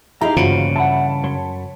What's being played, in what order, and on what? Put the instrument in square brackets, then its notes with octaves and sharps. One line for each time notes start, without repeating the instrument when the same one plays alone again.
[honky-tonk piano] D#4 E4 [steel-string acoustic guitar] G4 G#4 F5 [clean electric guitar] A#5
[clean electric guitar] D2 A#3 C5 [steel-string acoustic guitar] G2 E3 [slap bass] C#3 [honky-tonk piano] F4 F#4
[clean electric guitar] E5 F#5 [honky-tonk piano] A5 B5
[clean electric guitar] F#2 C#5 C6